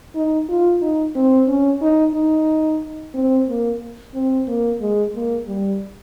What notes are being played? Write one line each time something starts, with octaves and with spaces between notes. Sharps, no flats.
D#4
F4
D#4
C4
C#4
D#4
D#4
C4
A#3
C4
A#3
G#3
A#3
G3